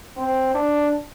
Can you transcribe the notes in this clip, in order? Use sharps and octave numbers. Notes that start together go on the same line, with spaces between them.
C4
D4